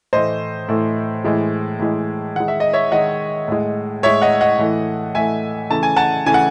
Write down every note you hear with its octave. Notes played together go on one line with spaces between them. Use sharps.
A2 E3 A3 C5 D#5
A2 E3 A3
A2 E3 G#3
A2 E3 G#3
D#3 G#3 F#5
E5
D#5
C#5 E5
D#3 G#3 D#5 F#5
A2 G#3
A2 G#3 C#5 E5
D#5 F#5
D#5 F#5
A2 E3 A3
A2 E3 A3 E5 G#5
C#3 E3 A3 A5
G#5
F#5 A5
C#3 E3 A3 G#5
F#5